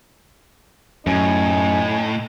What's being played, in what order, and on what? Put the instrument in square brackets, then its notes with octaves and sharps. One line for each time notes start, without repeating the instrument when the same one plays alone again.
[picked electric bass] F#2 [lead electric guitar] A2 [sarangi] D#4 [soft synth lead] G#5